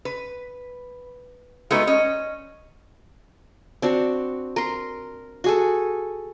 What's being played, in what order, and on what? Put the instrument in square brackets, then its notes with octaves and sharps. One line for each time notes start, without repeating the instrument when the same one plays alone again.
[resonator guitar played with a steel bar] B4
G#3 A3 B3 D#4 F#4 B4
C#4 D#5
[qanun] C4 D4 F#4
A#4 C6
F#4 G#4 A4